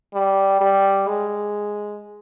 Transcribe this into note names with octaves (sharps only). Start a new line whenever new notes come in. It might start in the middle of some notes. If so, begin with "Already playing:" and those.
G3
G3
G#3